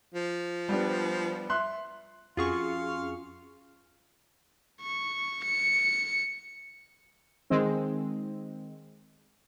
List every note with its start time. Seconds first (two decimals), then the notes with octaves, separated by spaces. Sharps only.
0.14 F3
0.68 G3 B3 D4
1.50 E5 C6 F#6
2.37 F2 C#4 F4 F#4 G#4 F5 C6 C#6
4.81 C#6
5.44 C#7
7.50 D#3 G#3 C4